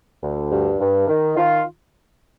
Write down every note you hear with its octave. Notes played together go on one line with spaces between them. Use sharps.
D2
G2
G2
D#3
D#3 F4